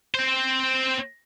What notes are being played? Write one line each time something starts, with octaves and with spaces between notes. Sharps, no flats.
C4 C5